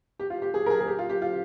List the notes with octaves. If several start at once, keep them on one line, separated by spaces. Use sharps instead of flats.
G4
F4
G4
G#4
A#4
G#4
G#4
G4
F4
G4
F4